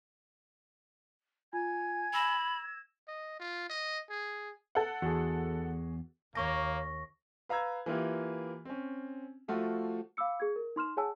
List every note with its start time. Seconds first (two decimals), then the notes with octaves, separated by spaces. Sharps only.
1.53 F4 G#5 G#6
2.14 B5 E6 A#6 E7
3.08 D#5
3.40 F4
3.70 D#5
4.10 G#4
4.75 A4 F#5
5.02 E2 F#4 G#4
6.35 D#2 A#3 C#5 C#6 D6 A#6
7.49 B4 F5 A#5 E6 G#6
7.86 E3 A#3 E4 F4 G4
8.65 C4 C#4
9.48 F3 A3 F4 F#4
10.17 F5 B5 D6 E6 C#7
10.40 G#4 G#6
10.56 A#4
10.76 D#4 C6 F6 E7
10.97 G#4 C#5 F#5 G#5 A5 E6